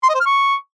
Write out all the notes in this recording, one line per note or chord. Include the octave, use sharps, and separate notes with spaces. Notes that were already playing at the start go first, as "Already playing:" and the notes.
C6
D#5
C5
F6
C#6